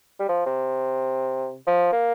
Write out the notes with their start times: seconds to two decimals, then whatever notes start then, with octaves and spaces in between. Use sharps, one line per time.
0.20 G3
0.29 F3
0.46 C3
1.67 F3
1.93 A#3